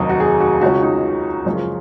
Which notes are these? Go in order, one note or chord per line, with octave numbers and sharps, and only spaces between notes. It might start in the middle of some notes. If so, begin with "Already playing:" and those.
Already playing: F1 D#2 D#3 F#3 D#4
F#4
G#4
F#4
C#2 C#3 G#3 C#4 F#4
D#4
F#1 F#2 F3 G#3 C#4
F4